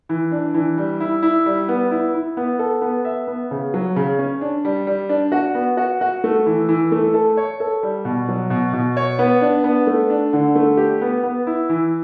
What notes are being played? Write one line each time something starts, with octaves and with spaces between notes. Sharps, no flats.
E3
D4
E3
G3
E4
E4
G3
B3
E4
E4
B3
A4
B3
E5
B3
C#3
F#3
C#3
C#4
D4
G3
G3
D4
F#4
B3
F#4
F#4
A3
E3
E3
A3
A4
C#5
A4
G3
B2
F#3
B2
B2
C#5
B3
D4
B3
A3
D4
D3
A3
G4
B3
B3
E4
E3